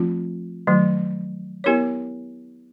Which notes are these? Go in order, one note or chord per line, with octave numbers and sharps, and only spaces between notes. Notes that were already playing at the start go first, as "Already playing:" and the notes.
Already playing: F3 A3 C4 F4
D#3 F#3 A3
B3 E4 G4 A#4 C#5